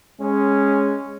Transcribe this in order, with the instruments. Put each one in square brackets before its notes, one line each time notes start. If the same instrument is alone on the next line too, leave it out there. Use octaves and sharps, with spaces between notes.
[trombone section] G#3 C#4